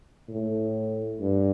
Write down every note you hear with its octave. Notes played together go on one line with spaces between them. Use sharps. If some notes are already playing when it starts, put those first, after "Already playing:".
A2
G2